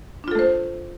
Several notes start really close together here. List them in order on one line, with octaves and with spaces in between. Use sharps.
D4 F4 A4 A3 C5